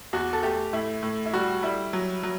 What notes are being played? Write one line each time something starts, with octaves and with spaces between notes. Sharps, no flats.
E2 F#4
A4
A3 G4
A2 E4
A2
E4
G3 F#4
G3 E4
F#3
F#3